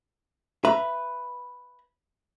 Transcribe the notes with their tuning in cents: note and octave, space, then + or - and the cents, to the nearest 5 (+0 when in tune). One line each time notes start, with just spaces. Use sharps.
B4 +0 E5 +20 A#5 +10